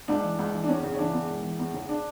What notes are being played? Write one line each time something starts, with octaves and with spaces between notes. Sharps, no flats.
C#2 D4
E3
C#2
E3
D4
E2 C#4
C#3
C#4
E3 D4
E2
E1
E3
E2
C#3
D4